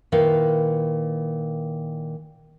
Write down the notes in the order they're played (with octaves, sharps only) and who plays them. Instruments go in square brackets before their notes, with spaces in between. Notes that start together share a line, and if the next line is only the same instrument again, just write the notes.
[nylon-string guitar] A#2 D#3 E4 B4 F5